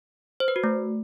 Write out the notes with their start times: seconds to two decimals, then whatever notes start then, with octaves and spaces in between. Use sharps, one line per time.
0.40 C5
0.48 B4
0.56 F#4
0.64 A3